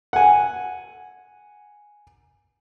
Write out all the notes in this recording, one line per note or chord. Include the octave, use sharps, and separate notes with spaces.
F#5 G#5